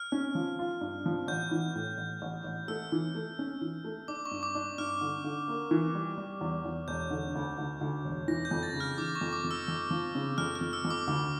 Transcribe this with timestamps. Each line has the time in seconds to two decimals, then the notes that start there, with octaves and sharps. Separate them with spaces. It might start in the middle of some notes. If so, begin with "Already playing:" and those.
Already playing: F6
0.12 C#4
0.35 F3
0.59 F4
0.81 G2
1.06 F3
1.28 A1 G6
1.51 E3
1.75 A2
1.98 A1
2.22 A1
2.44 A1
2.68 A3 E6
2.92 E3
3.15 A3
3.39 C#4
3.61 E3
3.84 A3
4.08 D4 D6
4.25 C#6
4.31 G2
4.43 D6
4.55 D4
4.78 G2 F6
5.01 D3
5.24 D3
5.48 A#3
5.71 E3
5.95 G3
6.18 G3
6.41 E2
6.65 E2
6.88 E1 G6
7.11 D3
7.35 D2
7.58 D2
7.81 D2
8.05 E1
8.28 E3 A#6
8.45 G6
8.51 F2
8.63 A6
8.74 C#3
8.80 F6
8.98 E3 D6
9.16 C#6
9.21 F2
9.33 D6
9.44 F2
9.51 E6
9.68 F2
9.91 F3
10.15 C#3
10.38 F2 F6
10.55 F6
10.61 F2
10.73 E6
10.85 F2
10.90 D6
11.07 D2 D6